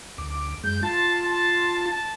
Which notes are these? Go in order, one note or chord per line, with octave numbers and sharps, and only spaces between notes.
D2 D6
F#2 G#3 G6
F4 A5 C6 A6
A5
A5